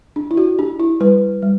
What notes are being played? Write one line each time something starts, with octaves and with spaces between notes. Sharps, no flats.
D4
E4
F#4
D4 G4
E4
G3 B4
G3